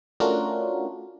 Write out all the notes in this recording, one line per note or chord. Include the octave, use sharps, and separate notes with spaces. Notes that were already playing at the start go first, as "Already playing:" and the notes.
A3 C#4 D4 F4 F#4 A#4